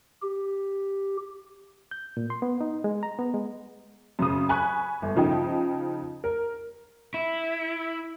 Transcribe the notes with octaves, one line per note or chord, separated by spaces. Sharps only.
G4
G6
A#2
C6
B3
D#4
G#3
A#5
B3
G#3
F#2 C#3 D#6
G#5 B5 C#6 F#6
G1
C#3 F3 D#4 G5
A#4
E4